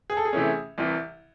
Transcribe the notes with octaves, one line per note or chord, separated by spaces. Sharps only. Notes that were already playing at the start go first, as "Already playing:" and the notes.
G#4
A4
G#4
C3 E3 A3 C#4
C2 C3 E3